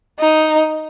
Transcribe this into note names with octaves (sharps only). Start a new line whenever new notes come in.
D#4